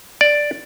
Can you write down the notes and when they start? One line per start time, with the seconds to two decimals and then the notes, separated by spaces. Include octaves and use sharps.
0.21 D5